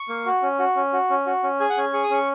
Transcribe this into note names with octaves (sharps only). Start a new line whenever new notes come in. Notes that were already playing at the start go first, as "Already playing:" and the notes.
Already playing: C#6
A#3
F#4
C#4
F#4
C#4
F#4
C#4
F#4
C#4
G#4 G#5
F#5
C#4 G#5
G#4 C#6
D#6
C#4 C#6